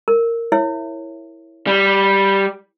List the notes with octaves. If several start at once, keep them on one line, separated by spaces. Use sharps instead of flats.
A#4
E4 C#5 E5
G3